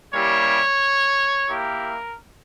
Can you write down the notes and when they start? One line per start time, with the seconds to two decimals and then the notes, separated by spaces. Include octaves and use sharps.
0.13 G3 A#3 C#4 E4 G4 C#5
1.49 A#3 E4 G4 A#4